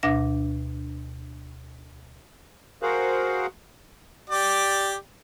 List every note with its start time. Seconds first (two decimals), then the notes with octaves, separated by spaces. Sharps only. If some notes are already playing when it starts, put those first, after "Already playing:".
0.03 D2 B2 D4 E5 A#6
2.82 F#4 G#4 A#4 C5 F5 F#5
4.30 G4 D5